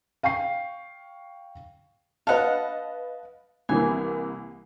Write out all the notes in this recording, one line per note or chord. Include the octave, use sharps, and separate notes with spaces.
F5 G5 C#6 C7
B4 D#5 F5 F#5 A5
C2 E3 A#3 G#5